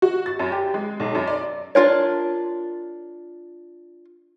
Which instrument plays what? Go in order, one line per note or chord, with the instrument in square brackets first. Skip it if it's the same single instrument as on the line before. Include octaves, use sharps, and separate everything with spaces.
[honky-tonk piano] F#4
A6
F#2
G4
G#3
B1
F#2
D5
[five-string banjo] D4 F4 A#4 C#5